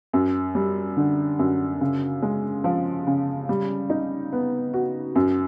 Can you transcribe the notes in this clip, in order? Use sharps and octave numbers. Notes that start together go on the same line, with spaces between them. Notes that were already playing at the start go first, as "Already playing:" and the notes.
F#2
G3
D3
F#2
C#3
G#3
F3
C#3
G3
D#4
B3
F#4
F#2